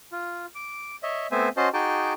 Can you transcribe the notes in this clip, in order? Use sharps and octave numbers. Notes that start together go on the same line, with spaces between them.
F4
D6
C#5 D#5 E5
A3 B3 C4 C5 E5 G#5
C#4 F#4 C5 D#5 A5 C6
D#4 F#4 G#4 G5 A5 D6